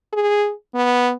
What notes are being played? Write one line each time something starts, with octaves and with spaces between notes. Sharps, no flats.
G#4
B3